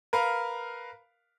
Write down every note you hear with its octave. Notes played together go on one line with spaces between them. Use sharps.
A#4 B4 F5